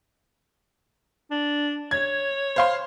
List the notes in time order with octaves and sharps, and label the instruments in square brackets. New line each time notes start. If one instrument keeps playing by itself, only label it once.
[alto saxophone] D4
[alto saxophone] C#5 [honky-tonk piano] G#6
[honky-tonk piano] C5 F5 C6